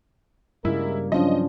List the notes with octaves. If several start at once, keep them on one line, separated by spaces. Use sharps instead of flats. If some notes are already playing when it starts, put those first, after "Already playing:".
G2 C#3 G3 G#3 A#3 E4 A#4
F3 F#3 C#4 D4 D#5